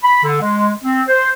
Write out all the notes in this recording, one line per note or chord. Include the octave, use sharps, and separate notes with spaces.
B5
D3
G#3
C4
C5